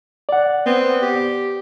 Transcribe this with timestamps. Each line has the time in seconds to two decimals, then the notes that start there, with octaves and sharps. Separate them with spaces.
0.29 D5 F#5
0.66 B3 C4
1.02 G4